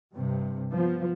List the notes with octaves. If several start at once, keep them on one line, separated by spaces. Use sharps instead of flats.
G2 C3
F3 B3